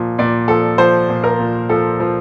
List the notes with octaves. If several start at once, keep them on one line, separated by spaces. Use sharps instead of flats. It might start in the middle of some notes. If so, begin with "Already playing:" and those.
Already playing: A#2 F3
A#2 D5
F3 A4
F3 C5
A#2
A#4
A#2
F3 A4
F3